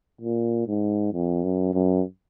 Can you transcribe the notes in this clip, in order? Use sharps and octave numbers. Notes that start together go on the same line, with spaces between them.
A#2
G#2
F2
F#2
F#2